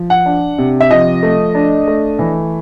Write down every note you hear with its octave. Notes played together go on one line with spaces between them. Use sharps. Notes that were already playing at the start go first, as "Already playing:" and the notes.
Already playing: F3
F#5
D4
C3
E5
F3 D#5
A3
D4
A3
E3